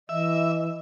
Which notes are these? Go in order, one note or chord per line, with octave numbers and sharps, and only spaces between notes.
E3 D#5 E5